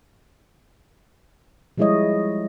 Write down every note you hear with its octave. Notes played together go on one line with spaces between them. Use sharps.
F3 G3 G#3 E4 C#5 D#5